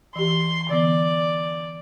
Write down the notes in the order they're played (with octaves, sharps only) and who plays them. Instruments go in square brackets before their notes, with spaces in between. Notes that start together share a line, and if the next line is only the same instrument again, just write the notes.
[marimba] E3 G4 [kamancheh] C6
[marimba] D3 E3 B3 [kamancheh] D5